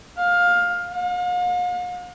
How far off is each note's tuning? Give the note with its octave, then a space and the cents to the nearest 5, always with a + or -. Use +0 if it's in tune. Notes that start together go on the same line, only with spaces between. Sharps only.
F5 +15
F5 +45